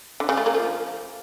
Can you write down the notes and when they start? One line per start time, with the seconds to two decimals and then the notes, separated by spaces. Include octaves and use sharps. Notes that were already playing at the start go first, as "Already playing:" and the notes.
0.20 D3
0.29 C#3
0.37 A3
0.46 A#3
0.55 F3